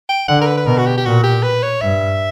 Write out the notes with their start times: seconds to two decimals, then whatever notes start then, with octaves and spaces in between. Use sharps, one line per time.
0.09 G5
0.28 D3 F#5
0.41 A#4
0.47 B4
0.58 B4
0.66 B2 A#4
0.78 F#4
0.86 G4
0.97 G4
1.05 A#2 F#4
1.24 G4
1.43 B4
1.63 C#5
1.81 G2 E5